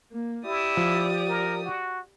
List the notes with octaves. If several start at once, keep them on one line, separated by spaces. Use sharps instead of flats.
A#3
E4 G4 D5 D#6
F3
A#4
F#4